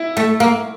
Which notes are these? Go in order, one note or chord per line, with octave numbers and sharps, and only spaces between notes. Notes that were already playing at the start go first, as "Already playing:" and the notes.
Already playing: E4
A3
A#3